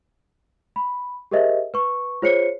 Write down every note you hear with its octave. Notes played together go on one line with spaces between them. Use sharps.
B5
G4 G#4 A#4 C5 D#5 E5
B4 C#6
F4 G#4 C5 C#5 C7 C#7